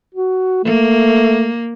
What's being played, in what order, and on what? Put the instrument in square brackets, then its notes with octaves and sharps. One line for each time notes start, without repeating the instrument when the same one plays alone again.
[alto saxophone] F#4
[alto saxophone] A3 [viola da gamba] A#3